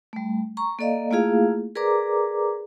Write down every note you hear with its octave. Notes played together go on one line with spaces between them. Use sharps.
G3 A3
A#5 C#6
A#3 A4 D5 D#5 F5
A3 A#3 E4 F4 G#4 F5
G#4 A#4 B4 D5 A#5 D6